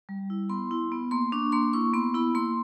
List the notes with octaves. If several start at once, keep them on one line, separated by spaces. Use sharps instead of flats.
G3
E4
B3 C6
E4
B3
A#3 C6
D4 C#6
A#3 C6
E4 C#6
B3 C6
E4 B5
A#3 C6